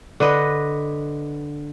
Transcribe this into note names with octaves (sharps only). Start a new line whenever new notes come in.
D3 B4 D#5